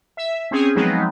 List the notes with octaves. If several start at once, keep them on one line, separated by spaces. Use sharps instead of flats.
E5
C4 C#4 G#4
F3 F#3 G#3 B3 C4 D#4